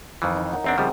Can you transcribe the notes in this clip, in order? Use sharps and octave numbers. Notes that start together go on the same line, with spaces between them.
F2 D#3 E3
D#4
A#4 C#5 F#5
E2 C4 D4 E5 A#5
C#3 F3 G3 G#3 C4